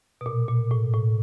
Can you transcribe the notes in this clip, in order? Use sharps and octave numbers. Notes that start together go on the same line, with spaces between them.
B2
A#2
A#2
A2
A2